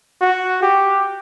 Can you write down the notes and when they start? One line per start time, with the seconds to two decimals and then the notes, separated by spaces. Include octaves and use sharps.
0.21 F#4
0.62 G4